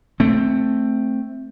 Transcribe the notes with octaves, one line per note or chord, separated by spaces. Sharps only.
A3 C4